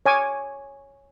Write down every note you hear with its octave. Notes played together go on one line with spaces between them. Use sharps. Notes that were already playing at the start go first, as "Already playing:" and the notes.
C#5 G#5 D6